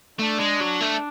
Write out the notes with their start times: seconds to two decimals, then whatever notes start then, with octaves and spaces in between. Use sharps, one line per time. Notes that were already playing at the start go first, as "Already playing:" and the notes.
0.19 A3 D4
0.40 G#3
0.61 F#3
0.81 A3